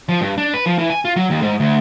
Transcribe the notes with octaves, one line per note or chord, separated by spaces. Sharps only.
F3
G2
D4
B4
F3
E3
G#5
F4
F#3
D#2
G#2
D2